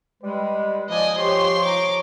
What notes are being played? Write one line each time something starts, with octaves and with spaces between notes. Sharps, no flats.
G3 G#3 B4
F3 D5 D#5 G#5
G4 C#5 C6
A#5 D6